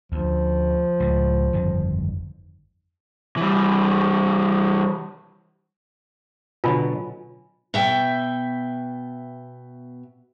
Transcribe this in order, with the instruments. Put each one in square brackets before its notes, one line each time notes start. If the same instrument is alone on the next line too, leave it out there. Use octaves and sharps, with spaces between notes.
[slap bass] D2 [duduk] F3
[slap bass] C#2 A2
G1 F2 D#3
[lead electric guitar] E3 G3
[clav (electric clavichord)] B2 D3 F#3 [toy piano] F4 G#5 B5
[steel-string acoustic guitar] B2 E5 G5